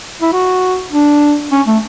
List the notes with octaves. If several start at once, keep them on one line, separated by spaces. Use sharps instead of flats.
E4
F#4
D4
C#4
A3